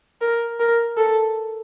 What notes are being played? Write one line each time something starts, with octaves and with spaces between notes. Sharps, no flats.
A#4
A#4
A4